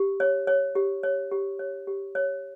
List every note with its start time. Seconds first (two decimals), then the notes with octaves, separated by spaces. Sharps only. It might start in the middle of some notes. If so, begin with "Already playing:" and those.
Already playing: G4
0.20 C#5
0.47 C#5
0.75 G4
1.03 C#5
1.31 G4
1.59 C#5
1.87 G4
2.15 C#5